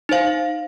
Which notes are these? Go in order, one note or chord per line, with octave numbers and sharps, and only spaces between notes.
D#4 C5 F5